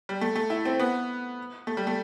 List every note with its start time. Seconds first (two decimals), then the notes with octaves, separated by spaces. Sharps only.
0.09 G3
0.21 A3
0.35 A3
0.50 E4
0.65 C4
0.79 B3
1.67 A3
1.77 G3
1.87 A3